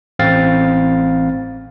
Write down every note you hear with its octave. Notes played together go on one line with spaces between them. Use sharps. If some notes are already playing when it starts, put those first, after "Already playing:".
A1 C4 F5 A6